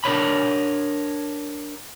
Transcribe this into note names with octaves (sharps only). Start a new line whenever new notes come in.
D4 A#4 C#5 B5